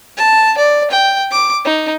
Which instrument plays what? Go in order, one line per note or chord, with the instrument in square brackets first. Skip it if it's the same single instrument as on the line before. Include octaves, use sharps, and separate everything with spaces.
[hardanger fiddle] A5
D5
G5
D6
D#4